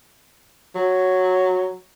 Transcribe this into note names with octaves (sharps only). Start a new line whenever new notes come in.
F#3